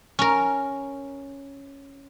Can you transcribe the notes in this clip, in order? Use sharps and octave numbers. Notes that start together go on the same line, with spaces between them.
C#4 A#4